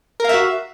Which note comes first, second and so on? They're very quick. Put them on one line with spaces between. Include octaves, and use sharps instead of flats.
A#4 F5 E5 F#4